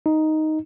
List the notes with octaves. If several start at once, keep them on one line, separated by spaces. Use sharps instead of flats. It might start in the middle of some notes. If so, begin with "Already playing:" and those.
D#4